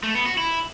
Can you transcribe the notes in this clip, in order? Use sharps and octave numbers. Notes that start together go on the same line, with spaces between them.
A3
B3
F#4
E4